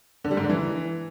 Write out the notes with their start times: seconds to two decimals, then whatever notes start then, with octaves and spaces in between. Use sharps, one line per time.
0.25 D3
0.31 G3
0.37 G#2
0.43 D3
0.49 E3